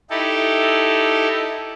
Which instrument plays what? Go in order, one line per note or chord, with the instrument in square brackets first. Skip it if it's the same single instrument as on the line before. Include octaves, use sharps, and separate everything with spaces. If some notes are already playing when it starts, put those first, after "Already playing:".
[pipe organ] D#4 E4 G4 A4